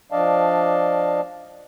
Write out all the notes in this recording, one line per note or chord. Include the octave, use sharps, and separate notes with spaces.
F3 D4 D5 D#5 F5 A5